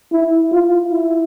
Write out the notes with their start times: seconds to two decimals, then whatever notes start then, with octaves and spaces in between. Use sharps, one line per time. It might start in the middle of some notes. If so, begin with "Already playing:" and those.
0.12 E4
0.52 F4
0.92 E4